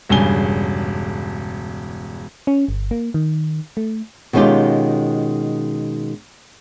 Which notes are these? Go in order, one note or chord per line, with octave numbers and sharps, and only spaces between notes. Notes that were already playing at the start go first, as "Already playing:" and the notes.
E1 G2 C#3 G#5 G7
C#4
G1
A#3
D#3
A3
B2 D#3 G#3 C#4 F4 G4